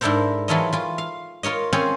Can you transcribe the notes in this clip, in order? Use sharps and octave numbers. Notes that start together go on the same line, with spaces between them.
G#2 D4 E4 A4 A#4 C5
E3 F#3 F4 A4 C#5 D#5
E3 F4
F5
F4 A#4 C#5 D#5
C4 C#4 F4 G#4 C#5